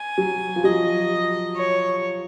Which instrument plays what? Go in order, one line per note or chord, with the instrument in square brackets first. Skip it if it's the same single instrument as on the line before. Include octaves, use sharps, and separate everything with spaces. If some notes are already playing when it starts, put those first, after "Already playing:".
Already playing: [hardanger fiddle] G#5
[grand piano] F#3
F3
[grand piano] F#3 [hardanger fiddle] D#5
[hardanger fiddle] C#5